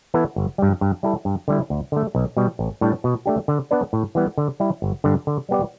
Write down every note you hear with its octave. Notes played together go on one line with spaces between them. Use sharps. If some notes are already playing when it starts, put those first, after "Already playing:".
E3 B3 E4 A4
G1
G2 G3
G2
G3 E4 A4
G2
D3 G3 E4
D2
D3 A3
B1
B2 G3
A1
A2 G3 D4
B2
A3 D4 G4
D3
B3 D4 B4 D5
A2
E3 G3 B3
D3
G3 E4
G1
G2 D3
D3
G3 B3 G4 D5